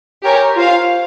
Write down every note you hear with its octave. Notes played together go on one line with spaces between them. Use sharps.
G4 A#4 C#5 G#5
F4 C5 F5